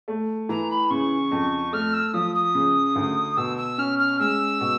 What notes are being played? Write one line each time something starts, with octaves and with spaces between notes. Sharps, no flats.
A3
E3 A#5
B5
C#3 C#6
F2
A3 F6
E6
F3 D#6
D#6
C#3
D2
B2 E6
E6
C#4 F6
F6
G#3 E6
B2